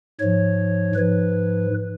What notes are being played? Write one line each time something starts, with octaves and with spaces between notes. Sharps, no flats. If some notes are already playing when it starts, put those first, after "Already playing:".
G#2 F3 C#5
G#2 F3 B4